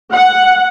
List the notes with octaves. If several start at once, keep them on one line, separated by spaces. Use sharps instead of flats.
F#5